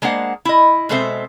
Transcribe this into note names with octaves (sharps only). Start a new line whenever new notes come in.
G#3 A#3 D4 C5 F#5
E4 D#5
B2 G#3 C4 A4 C5 E5